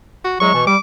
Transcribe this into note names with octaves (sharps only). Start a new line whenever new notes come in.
F#4
E2 F#3 G#3 C#6
B2 E3
G3 D6